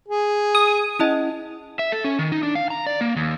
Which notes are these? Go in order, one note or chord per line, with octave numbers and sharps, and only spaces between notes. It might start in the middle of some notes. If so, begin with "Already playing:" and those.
G#4
D#6 G#6
C#4 E4 D#5
E5
A4
C#4
D#3
D#4
D4
F5
A#5
D5
A#3
D#2